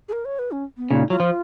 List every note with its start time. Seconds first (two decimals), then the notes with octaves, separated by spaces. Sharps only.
0.09 G#4
0.13 A#4
0.25 C#5
0.39 B4
0.51 C#4
0.77 B3
0.91 A#2 C#3 D#4
1.10 F#3 F4
1.20 F3